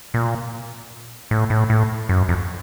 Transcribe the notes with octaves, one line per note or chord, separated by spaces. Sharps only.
A#2
A2
A2
A2
F#2
F2